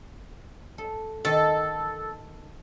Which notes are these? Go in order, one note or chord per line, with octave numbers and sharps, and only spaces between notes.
A4
D#3 A4